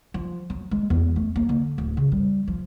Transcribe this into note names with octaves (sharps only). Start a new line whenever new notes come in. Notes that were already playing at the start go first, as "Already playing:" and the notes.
F3
F#3
G#3
E2
A3
A#3
D3
D1
C#3
G3
F3